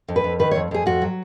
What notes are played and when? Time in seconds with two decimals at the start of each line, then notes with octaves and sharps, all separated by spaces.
0.08 F2
0.16 B4
0.24 F2
0.40 D#3 B4
0.51 C#5
0.55 F2
0.71 F2 G#4
0.86 F2 F#4
1.02 F#3